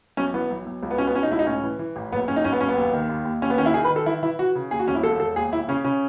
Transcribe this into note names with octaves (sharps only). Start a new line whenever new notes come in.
B1 C#4
E3 B3
B1
B1
C#2
B3
B2 C#4
B3
B2 C#4
D#4
C#2 E4
D#4
A2 C#4
E3
E3
A1
F#1 B3
F#1 C#4
D#4
F#1 C#4
B3
F#1 C#4
B3
D#2
D#3
D#2
D#2
D#2 C#4
B3
D#3 C#4
E4
D#3 G#4
B4
D#3
A4
E3 E4
E3 E4
E3 F#4
C#3
D#2 G#4
F#4
E1 C#4
E4
E1 A4
E1 A4
D#2 G#4
D#2 E4
C#3 C#4
C#3 C#4